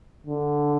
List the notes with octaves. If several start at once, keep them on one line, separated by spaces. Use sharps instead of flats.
D3